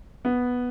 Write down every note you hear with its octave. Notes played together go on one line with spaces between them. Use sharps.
B3